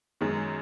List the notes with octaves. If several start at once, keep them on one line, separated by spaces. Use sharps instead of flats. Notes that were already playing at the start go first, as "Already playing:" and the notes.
F#2 D#3 G#3